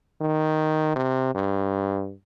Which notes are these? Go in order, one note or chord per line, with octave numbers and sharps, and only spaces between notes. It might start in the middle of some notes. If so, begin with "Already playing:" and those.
D#3
C3
G2